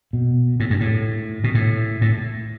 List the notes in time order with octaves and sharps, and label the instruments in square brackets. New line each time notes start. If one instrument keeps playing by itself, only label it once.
[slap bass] B2
A2
G2
A2
B2
A2
A2